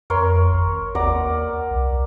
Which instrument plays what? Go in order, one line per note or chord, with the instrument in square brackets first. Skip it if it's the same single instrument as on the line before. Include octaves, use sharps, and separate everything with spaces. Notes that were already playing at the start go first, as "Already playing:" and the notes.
[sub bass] F2 [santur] A#4 C#5 C6
[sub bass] G#1
[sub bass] D#2 [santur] D5 F#5 A#5
[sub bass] C2